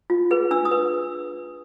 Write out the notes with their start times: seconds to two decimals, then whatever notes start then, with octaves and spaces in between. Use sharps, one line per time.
0.10 F4
0.31 G#4 B4
0.51 D4 E6
0.65 D#6
0.71 B4